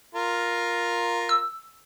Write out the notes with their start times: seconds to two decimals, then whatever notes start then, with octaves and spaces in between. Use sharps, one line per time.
0.15 F4 A#4
1.29 E6